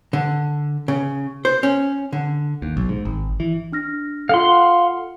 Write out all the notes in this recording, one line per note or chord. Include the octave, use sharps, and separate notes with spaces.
D3
C#3
C5
C#4
D3
D#2
B1
G#2
G#1
E3
D4 F6 A#6
F4 A4 F5 F#5 C6